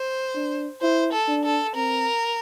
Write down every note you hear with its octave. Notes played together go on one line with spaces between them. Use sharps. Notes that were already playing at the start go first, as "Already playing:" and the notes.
Already playing: C5
D4
E4 C5
A4
D4
A4
C4 A#4